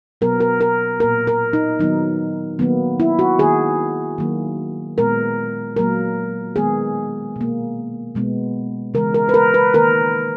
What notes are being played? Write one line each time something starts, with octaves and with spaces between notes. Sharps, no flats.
B2 F#3 B3 A#4
A#4
A#4
A#2 A#3 A#4
A#4
D#4
D#3 F#3 B3 D#4
D#3 F#3 A#3 B3
E4
F#4
D#3 A#3 G#4
D#3 F#3 A#3
A#2 G#3 B3 A#4
A#2 F#3 A#3 A#4
D#3 G#3 B3 G#4
B2 A#3
B2 G#3 B3
C#3 E3 G#3 A#4
A#4
B4
A#4
B4
D#3 A#3 A#4